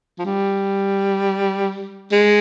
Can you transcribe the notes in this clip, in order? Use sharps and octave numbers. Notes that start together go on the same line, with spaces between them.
F3
G3
G#3